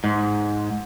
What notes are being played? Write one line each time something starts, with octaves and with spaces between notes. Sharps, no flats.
G#2